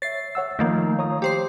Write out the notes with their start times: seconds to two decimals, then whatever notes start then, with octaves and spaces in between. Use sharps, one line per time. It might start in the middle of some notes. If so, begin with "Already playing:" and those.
0.02 C#5 E5 A6 C7
0.35 C#5 F#5 E6
0.59 D#3 F3 A3 A#3
0.99 C#5 A#5 D#6
1.22 G4 C5 C6 D6